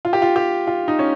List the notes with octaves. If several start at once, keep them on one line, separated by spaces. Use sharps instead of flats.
F4
G4
F4
G4
F4
D#4
C#4